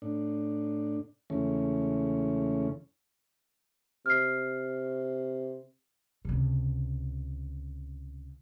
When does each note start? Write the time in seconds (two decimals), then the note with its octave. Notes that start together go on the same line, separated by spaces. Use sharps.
0.02 A2 D4
1.30 E2 C#3 E3 G#3 A3 C#4
4.06 C3 F6 C7
6.25 C#2 C3